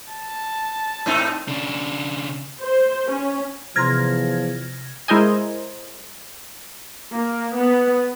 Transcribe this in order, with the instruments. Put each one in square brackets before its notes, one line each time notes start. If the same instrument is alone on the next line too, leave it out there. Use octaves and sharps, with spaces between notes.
[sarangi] A5
[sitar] G#2 C4 D#4
[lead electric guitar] C#3 D4
[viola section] C5
C#4
[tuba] E2 [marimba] C3 A#5 C6 [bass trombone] F3 [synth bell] F6 G#6 A#6
[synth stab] G#3 E4 A#4 C5 D#5 G#5
[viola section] A#3
B3